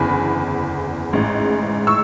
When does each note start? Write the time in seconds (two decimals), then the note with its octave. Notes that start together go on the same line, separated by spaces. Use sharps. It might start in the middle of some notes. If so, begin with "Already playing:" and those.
Already playing: F#1 E2 D3 G#5 B5
1.13 A1 G#2 G#3
1.87 C#6 E6